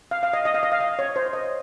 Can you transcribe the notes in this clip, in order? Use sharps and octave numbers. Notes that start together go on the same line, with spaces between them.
F5
F5
D#5
D#5
F5
D#5
F5
D#5
C#5
C5
D#5